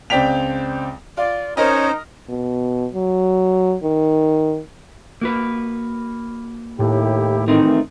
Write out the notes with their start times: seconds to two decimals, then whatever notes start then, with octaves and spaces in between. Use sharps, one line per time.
0.10 C#2 C4 D5 G5 B6 F7
1.17 F4 D5
1.57 C#4 D#4 A#4 C5 C#5 D#5
2.29 B2
2.93 F#3
3.83 D#3
5.21 A#3 F#4 B4
6.79 D#2 A2 E4 G4
7.48 D#3 E3 A3 C4 D#4